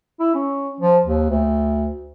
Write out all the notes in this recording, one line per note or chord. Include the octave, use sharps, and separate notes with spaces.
E4
C#4
F3
D#2
D2